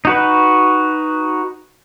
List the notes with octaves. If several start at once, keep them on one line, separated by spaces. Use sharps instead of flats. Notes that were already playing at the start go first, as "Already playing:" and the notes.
D#4 F#4 B4